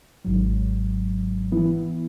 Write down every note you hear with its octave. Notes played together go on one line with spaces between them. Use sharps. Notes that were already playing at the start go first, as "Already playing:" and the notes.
G#1 G#2 F#3
E3 B3 E4